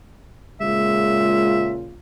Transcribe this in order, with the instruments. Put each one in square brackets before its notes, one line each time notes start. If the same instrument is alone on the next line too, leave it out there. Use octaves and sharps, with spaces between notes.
[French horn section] A#2 C#3 F4 [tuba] G#3 [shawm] E5